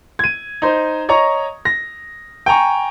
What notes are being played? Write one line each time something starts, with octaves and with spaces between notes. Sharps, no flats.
G#6 D#7
D#4 C5
C#5 D#5 A#5 C#6
A#6
G5 G#5 A#5 C#6